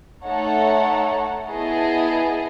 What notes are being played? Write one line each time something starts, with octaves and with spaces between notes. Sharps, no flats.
A3 D#4 A4 C#5 F#5
B3 E4 G#4 D#5 A5